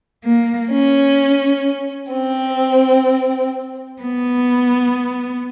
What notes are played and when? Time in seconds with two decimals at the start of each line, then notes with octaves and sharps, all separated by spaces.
0.24 A#3
0.71 C#4
2.13 C4
4.02 B3